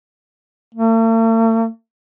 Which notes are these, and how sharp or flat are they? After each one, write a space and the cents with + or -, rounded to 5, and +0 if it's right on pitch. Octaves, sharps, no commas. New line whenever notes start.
A3 +45